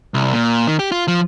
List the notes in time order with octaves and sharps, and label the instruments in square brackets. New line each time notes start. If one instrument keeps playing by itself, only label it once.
[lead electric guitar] C2
A#2
D#3
G4
F4
F3